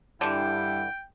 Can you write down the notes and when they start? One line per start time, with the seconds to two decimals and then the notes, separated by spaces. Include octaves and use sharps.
0.21 G2 D3 E3 E4 G5